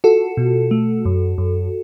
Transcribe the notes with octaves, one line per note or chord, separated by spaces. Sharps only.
F4 F#4 A4
B2
A3
F#2
F#2